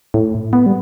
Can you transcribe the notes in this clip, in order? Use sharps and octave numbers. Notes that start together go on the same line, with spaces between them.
A2
B3
G3